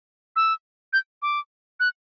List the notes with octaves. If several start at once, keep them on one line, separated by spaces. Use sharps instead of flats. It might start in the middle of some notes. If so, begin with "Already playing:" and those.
E6
G6
D6
F#6